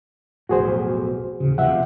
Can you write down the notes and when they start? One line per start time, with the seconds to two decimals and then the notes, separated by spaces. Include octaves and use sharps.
0.49 B1 F2 A2 F#4 G#4 C5
1.40 A1 D#2 C#3
1.58 E1 C3 F3 E5 F#5